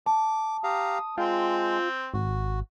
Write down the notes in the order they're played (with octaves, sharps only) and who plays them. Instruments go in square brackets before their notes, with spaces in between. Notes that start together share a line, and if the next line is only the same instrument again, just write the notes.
[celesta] A5 [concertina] D6
[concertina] G4 F5 A#5 [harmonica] D#6
[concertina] G#3 [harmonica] C4 G5 [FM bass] F4
[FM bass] G#1 [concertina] F#4